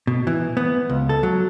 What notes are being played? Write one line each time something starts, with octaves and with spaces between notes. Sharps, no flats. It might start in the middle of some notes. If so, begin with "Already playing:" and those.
B2
E3
B3
C#2
A4
F#3